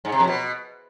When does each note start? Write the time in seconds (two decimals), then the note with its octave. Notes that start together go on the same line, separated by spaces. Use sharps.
0.05 G#2
0.12 C3
0.20 F2
0.27 B2